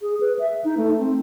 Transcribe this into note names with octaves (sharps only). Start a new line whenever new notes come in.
G#4
B4
E5
D#4
A3
C4